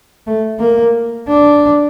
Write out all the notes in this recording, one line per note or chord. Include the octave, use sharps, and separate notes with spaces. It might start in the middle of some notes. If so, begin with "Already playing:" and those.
A3
A#3
D4